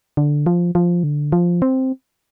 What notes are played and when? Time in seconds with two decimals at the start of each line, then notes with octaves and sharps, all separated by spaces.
0.17 D3
0.46 F3
0.75 F3
1.04 D3
1.32 F3
1.62 C4